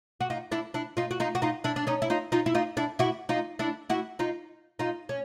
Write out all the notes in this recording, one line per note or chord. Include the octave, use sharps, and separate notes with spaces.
F#4
D#4 F4
D4 E4
D4 E4
D#4 F4
F#4
D#4 F4
F#4
D#4 F4
D4 E4
D4
C#4 D#4
E4
D#4 F4
D#4 F4
E4
D#4 F4
D4 E4
E4 F#4
D#4 F4
D4 E4
E4 F#4
D#4 F4
D#4 F4
C#4